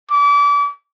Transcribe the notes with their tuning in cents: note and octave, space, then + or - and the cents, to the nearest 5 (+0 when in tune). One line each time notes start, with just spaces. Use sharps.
D6 -35